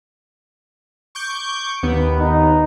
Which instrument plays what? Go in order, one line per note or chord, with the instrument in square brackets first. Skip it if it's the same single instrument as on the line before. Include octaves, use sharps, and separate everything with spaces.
[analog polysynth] C#6 D6 G6
D#2 B3
[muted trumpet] D#4